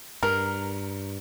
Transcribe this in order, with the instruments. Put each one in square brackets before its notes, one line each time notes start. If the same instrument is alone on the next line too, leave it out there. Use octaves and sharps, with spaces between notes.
[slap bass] G2 [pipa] A#4